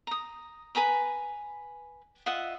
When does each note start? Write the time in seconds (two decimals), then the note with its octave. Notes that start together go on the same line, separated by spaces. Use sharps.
0.07 A#5 D#6
0.75 B4 G#5 A#5 B5
2.26 F4 D#5 E5 F#5